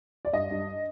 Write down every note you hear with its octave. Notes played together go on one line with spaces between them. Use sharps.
D5
G2 D#5
G2